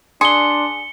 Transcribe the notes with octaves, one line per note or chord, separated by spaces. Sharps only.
D4 G#4 C6 C#7 G7